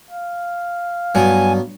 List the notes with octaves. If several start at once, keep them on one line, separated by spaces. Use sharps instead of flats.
F5
G2 F#3 B3 G#5